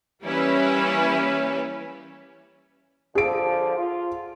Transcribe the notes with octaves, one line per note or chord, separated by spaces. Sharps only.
E3 G3 A#3 C#4 E4 B4
D3 F3 G#4 D7
F4